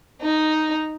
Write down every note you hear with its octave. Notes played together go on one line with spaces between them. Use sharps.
D#4